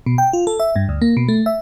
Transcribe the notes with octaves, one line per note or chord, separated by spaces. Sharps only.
B2
G5
F4
A4
E5
G2
D2
A#3
B2
A3
E5